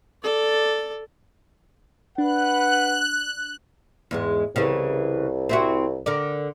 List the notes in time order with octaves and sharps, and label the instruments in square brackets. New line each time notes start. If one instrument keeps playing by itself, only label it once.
[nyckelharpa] A4 D5
[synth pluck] D4 [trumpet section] B4 F#5 [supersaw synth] F#6
[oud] E2 G#2 G#3
[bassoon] C2 [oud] C#3 E3
[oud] C4 E4 F#4
D3 A#4 D5